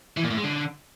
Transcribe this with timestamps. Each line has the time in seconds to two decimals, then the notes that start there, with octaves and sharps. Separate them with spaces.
0.17 E3
0.24 A#2
0.30 A2
0.37 G#3
0.44 D3